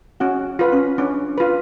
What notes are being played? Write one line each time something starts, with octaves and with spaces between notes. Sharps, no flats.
C#4 F#4
F4 B4
C#4
C#4 D4
F4 B4